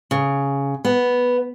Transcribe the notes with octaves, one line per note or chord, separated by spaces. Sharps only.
C#3
B3